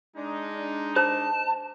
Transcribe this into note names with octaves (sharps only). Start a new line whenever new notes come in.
G#3 D4 D#4
C5 A5